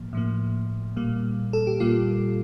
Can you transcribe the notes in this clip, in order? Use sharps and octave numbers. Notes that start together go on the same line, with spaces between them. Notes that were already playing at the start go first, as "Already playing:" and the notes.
Already playing: A2 F3 A#3
A2 F3 A#3
A#2 G3 A#3
A4
G4
A#2 G3 A#3 F4